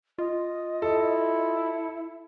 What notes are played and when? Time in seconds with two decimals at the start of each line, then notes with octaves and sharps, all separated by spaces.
0.18 F4 D#5
0.82 E4 A4